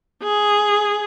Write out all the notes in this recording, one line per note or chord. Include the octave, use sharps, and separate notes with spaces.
G#4